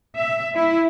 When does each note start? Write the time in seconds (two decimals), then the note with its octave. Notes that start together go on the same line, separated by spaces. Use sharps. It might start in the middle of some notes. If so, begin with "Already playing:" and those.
0.14 E5
0.55 E4